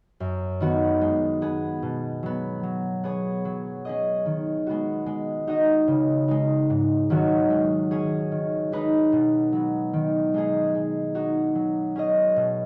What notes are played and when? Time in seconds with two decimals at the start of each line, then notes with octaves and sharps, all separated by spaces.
0.20 F#2
0.60 D#3 B3 F#4
1.01 G#3
1.42 B3 G#4
1.82 B2
2.23 F#3 B3
2.63 F#3
3.04 B3 G#4 C#5
3.45 F#3
3.85 C#4 G#4 D#5
4.26 D#3
4.67 G#3 B3 F#4
5.06 G#3
5.47 D#4 F#4 D#5
5.87 C#3
6.28 G#3 D#4
6.70 G#2
7.10 D#3 F#3 C#4 F#4
7.50 G#3
7.91 C#4 G#4 C#5
8.31 D#3
8.72 G#3 D#4 B4
9.12 B2
9.52 F#3 B3
9.93 D#3
10.34 G#3 D#4 G#4
10.74 G#3
11.15 D#4 F#4
11.55 F#3
11.96 C#4 G#4 D#5
12.36 B2